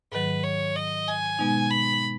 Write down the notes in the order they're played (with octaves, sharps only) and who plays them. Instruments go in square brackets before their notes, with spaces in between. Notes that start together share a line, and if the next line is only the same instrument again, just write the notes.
[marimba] G#2 D#3 F#3 [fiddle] B4
[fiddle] C#5
D#5
G#5
[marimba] B2 G#3 B3 D#4
[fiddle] B5